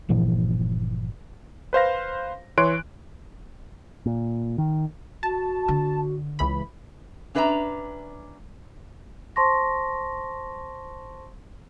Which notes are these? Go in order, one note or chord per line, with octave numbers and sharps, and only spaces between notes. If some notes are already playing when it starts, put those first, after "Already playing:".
G1 A#2 E3 F3
B4 C5 F5 A#6
E3 C#5 C6 F#6 D7
A#2
D#3
F#4 A5
D3
C#2 E3 B5
C#4 D4 B4 E5 G#5 A#5
C5 A5 C6 C#6 A#6